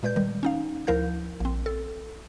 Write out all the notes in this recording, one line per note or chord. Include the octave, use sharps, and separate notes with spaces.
A#2 G#3 B4 D5 G6
D#3 G3
C#4 D#4 F5
D2 F3 E4 A#4 F5 G6
A#1 C4
A4